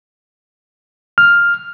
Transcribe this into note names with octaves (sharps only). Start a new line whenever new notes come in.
F6